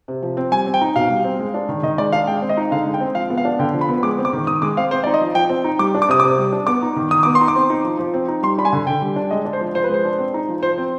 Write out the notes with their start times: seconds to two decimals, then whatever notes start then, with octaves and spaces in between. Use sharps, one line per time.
0.08 C3
0.22 F3
0.37 C4
0.52 G3 G#5
0.66 C4
0.74 G5
0.81 D#4
0.96 B2 F5
1.10 G3
1.24 C4
1.39 G#3
1.54 D4
1.69 D#3
1.83 D#3 D#5
1.98 G#3 D5
2.12 D4 F5
2.27 G#3 G5
2.42 C4
2.49 D#5
2.57 D#4
2.71 D3 F5
2.86 G#3
2.94 G5
3.00 C4
3.15 F3 F5
3.30 B3
3.38 F5
3.45 D4
3.59 D3 G5
3.74 F3
3.81 B5
3.89 B3
4.03 G#3 D6
4.18 C4
4.25 D6
4.33 D#3
4.47 D#3 D#6
4.62 G#3 D6
4.77 C4 F5
4.91 C4 C5
5.04 D#4 D5
5.14 D#5
5.21 F3
5.35 F3 G5
5.49 C4
5.64 D#4
5.79 G3 D6
5.95 D4
6.02 D6
6.09 C3 D#6
6.20 C3 D6
6.38 G3
6.52 D4
6.67 B3 D6
6.82 D#4
6.96 D#3
7.11 D#3 D#6
7.23 B3 D6
7.35 C6
7.41 D#4
7.48 D6
7.56 C4
7.70 D#4
7.85 F3
7.99 F3
8.14 C4
8.28 D#4
8.43 G3 C6
8.58 D4 B5
8.65 G#5
8.73 D3
8.86 D3 G5
9.02 G3
9.16 D4
9.31 G#3 D#5
9.45 D4
9.53 C5
9.61 F3
9.75 F3 C5
9.84 B4
9.89 G#3 C5
10.05 D4
10.18 C4
10.34 D#4
10.48 F3
10.63 F3 C5
10.78 C4